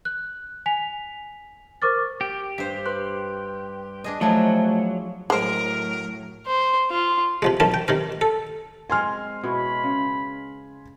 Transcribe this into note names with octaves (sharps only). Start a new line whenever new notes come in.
F#6
G#5 B6 F7
A#4 C5 C#6 D6 F6 A6
G4
G2 C5 B6
B4 C6 F#6
D4 G#4 D#5
F3 F#3 A3 E4 A5 G#6
A2 F#3 G#3 A#4 C5
C5
F4
C3 F3 G#3
B1 F#2 E3 A#4 A5
G5
C3 D#3 A#4
A4
G#3 C4 G#5 C6 F6
B2 E4 C#5 B5
C#3